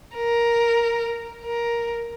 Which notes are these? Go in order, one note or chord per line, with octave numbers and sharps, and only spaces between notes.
A#4
A#4